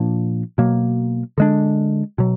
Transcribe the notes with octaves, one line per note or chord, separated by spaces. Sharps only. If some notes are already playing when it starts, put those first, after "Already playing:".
Already playing: A#2 F3 A#3 D4
B2 F#3 A#3
D3 G#3 D4
B2 F#3